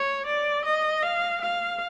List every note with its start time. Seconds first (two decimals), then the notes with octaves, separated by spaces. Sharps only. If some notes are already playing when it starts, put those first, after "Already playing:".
Already playing: C#5
0.26 D5
0.65 D#5
1.03 F5
1.41 F5